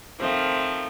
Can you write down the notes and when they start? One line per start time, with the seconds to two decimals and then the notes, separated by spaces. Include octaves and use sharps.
0.20 D#3 F3 A3 C4